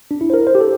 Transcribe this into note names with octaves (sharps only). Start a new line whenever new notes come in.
D4
E4
C5
A#4
C5
G4
A4